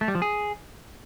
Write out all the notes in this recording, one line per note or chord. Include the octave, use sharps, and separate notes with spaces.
A3
G3
F3
G#4